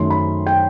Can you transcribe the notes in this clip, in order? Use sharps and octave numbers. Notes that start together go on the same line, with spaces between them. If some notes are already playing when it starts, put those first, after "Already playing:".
Already playing: F#2 D#3 F#3 A3 C6
B5
G5